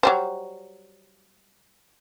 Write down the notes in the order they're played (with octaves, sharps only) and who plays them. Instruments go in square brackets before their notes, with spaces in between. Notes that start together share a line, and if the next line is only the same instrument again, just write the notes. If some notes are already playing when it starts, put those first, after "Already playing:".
[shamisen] F#3 G3 C5